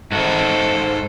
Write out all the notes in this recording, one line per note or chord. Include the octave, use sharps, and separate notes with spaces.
G#2 F#4 A4 C5